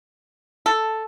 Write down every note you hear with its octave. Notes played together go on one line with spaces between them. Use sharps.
A4